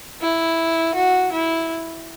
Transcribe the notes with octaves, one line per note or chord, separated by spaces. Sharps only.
E4
F#4
E4